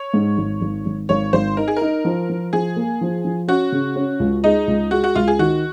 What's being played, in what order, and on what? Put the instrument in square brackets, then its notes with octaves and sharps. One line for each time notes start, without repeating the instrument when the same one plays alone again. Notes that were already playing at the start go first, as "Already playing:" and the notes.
Already playing: [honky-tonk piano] C#5
[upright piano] G#2
G#1
G#1
G#1
[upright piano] G#1 [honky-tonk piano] C#5
[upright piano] G#1 [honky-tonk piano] C5
[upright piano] D#4 [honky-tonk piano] A#4
[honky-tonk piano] G#4
A#4
[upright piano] D#4
F3
F3
[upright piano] F3 [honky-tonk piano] G#4
[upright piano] A#3
F3
F3
[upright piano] C#4 [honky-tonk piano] F#4
[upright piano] C#3
C#4
C#2
[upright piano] G#3 [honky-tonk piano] D#4
[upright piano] C#2
[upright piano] G#3 [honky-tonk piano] F#4
[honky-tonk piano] F#4
[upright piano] C#2 [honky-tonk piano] F4
[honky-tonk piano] G#4
[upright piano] D#3 [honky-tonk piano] F#4